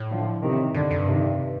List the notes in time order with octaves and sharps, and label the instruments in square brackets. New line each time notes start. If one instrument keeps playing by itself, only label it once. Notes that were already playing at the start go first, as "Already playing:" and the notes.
Already playing: [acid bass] A2
[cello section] D3 F3
C3 D#3
[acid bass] G2 [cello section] D3
[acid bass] F2
G2
[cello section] C3 D#3